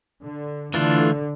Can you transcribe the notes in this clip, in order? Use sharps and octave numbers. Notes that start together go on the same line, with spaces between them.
D3
D3 E3 A3 D4 F4